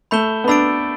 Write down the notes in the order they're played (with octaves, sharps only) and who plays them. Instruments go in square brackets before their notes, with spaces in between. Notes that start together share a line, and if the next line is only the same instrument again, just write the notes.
[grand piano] A3 [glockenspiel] B5 G6 E7 G7
[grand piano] B3
[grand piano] D4 [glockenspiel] B5 E6 A6 D7